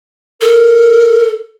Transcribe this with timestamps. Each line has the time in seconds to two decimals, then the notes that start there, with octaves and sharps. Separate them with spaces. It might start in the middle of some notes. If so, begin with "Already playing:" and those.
0.41 A4 A#4